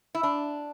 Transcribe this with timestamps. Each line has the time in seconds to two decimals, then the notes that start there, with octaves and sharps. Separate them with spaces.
0.15 E4
0.23 D4